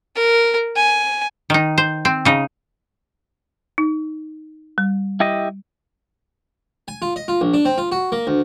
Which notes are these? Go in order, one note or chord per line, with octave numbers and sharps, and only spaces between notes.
A#4
G#5
D#3 D#4
C5
C4
C#3 D#4
D#4
G3
E4 G4 D#5
G#5
F4
D#5
F4
A#1
D4
C4
F4
F#4
A#3
D2